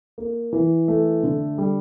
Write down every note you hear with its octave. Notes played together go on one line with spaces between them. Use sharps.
A#3
E3
A3
D3
G3